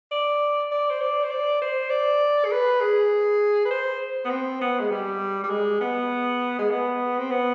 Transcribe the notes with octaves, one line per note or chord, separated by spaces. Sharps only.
D5
D5
C5
D5
C5
D5
C5
D5
G#4
B4
G#4
B4
C5
B3
C4
B3
G#3
G3
G3
G#3
B3
G#3
B3
C4
B3